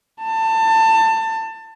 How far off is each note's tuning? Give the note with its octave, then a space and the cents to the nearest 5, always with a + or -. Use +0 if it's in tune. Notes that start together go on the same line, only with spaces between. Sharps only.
A5 +25